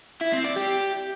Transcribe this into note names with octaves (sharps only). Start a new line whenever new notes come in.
E4
C4
D5
G4